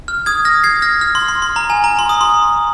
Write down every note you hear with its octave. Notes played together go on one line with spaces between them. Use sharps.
F6
D#6 G#6
F6 A#6
G#6 C7
F6 A#6
F6
C6
C6
C6
A#5
G#5
A#5
C6
D#6
C6